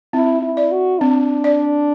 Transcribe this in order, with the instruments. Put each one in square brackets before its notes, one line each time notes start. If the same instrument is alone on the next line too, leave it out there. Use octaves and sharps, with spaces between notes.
[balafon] C4 [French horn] E4
[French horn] E4
[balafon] D5
[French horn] F#4
[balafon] C4 [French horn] D4
[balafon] D5